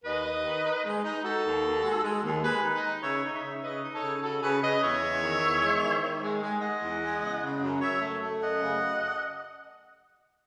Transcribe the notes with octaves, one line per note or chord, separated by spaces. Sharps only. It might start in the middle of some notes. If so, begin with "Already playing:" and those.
D#2 B4 D#5
D#2
D#3
D#4
G#3
D#4
D#4 F#4 A4
D#2
D#2
G#3
G#3
D#2
G#3 G#4 B4
D#4
B4 D#5
D#4
C#3 C#5 E5
D#4
C#5 E5
C#3
C#3 B4 D#5
D#4
A4 C#5
C#3
C#3 F#4 A4
C#3 G#4 B4
C#3 B4 D#5
E2 C#5 E5
E2
D#3
E2
G#3
D#3
D#3
G#3
G#3
G#3 D#5 F#5
E2
G#3
C#3
C#3
F#2
F#2 C#5 E5
A3
A3
F#2 D#5 F#5
C#3